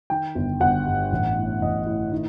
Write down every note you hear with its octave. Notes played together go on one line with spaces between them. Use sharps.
D#3 G5
G1
G1 F#5
G2
A1
A2
A1 D#5
A2
D#3